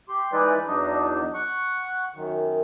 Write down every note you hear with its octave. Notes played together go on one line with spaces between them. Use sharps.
G4 C6
E3 G#3 D#4 E4 B4 D5
E2 F#3 D4 D#4 D#5
F#5 C#6
F#2 D#3